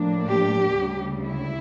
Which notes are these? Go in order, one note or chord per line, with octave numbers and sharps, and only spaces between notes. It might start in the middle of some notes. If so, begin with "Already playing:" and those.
Already playing: A2 F3 A#3 D4
G4
D2 C#3 G3
E4